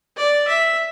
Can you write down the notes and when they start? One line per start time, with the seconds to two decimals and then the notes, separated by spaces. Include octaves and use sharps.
0.17 D5
0.47 E5